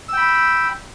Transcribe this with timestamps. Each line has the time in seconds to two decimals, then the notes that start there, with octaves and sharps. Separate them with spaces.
0.09 E6
0.13 G5
0.18 B5